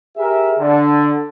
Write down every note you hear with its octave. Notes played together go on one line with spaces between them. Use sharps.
G4 G#4 A#4 E5
D3